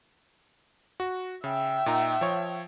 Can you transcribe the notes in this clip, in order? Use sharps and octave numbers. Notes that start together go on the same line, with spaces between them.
F#4
C#3 E5 G5
A#2 D#4 A#5
F3 C#5